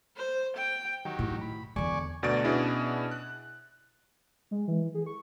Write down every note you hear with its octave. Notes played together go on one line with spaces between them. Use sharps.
C5
G5
D#3 F#3 G4
A2 E4
B5
E2 D3 D5 G#5 C#6
D2 B2 D5 A6 D7
B2 C#4 D4 E4 G#4
F#6
G#3
E3
G#4
C#6